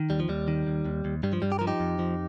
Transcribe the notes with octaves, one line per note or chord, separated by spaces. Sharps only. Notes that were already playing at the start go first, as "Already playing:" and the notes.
Already playing: D#3
D#2 G3
F3
D#2 G3
D#3
D#2
D#2
D#2
G2 G3
F3
G2 G3
G4
F3 A#4
D#4 G4
F2
F3